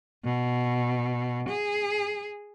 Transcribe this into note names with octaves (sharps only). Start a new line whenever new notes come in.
B2
G#4